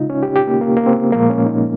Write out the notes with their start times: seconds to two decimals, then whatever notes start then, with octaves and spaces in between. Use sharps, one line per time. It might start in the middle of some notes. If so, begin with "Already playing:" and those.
Already playing: C#3 G#3 D#4 F4
0.10 C#4
0.23 G4
0.36 G4
0.48 A#3
0.61 A#3
0.77 A#3
0.87 C4
1.12 A#2 F3 G#3 A#3
1.30 C#4
1.46 D#4